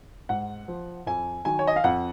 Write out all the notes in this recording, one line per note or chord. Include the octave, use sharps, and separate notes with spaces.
G#2 F#5
F3
F2 G#5
D#3 F#3 G#5
C#5
D#5
F5
F2 F#5